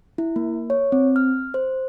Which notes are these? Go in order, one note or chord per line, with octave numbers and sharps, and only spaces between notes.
E4
A#3
C#5
C4
F6
C5